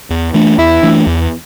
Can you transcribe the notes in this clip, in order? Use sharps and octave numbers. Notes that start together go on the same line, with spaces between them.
E2
E3 A3 D4
E2 E4
E3 A3 D4
E2